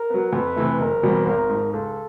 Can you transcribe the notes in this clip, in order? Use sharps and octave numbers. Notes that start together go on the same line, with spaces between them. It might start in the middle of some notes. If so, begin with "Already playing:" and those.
Already playing: A#4
F#3 B3
F2 B4
C3 E3 A3
F#1 A#4
E2 B2 G3 C4
G#1 A#4
G#2
F3
C#2 A4